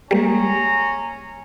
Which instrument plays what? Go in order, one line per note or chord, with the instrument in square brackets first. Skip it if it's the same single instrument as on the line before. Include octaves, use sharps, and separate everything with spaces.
[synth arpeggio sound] G3 G#3 A#3 [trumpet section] C#4 G#4 A#5